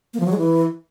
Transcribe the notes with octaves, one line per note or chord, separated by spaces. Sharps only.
A#3
F3
F#3
G#3
E3